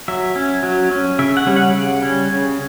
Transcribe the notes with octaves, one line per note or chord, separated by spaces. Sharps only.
F#3 E5
C#4
F#3
C#4
C#3 E5
F#5
G3 C#4
F#5
C#3
G3 C#4
C#3